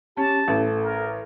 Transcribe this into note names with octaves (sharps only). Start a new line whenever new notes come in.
C#4 G4 A5
A1 A4
A#4